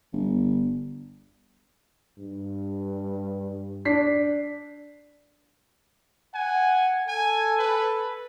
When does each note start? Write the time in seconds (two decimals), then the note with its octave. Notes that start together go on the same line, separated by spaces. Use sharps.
0.13 G1
2.18 G2
3.85 D4 B6 C7
6.35 F#5 G#5
7.08 A4 G#5
7.58 B4